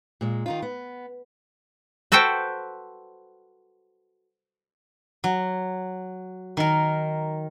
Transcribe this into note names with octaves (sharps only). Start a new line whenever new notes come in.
A#2 G#3
D#3 D#4 F4
B3
F#4 A4 B4 C5 G5
F#3
D#3 A#4